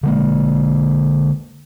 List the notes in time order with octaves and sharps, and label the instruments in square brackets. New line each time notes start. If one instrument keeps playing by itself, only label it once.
[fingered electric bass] D3 G#3 A#3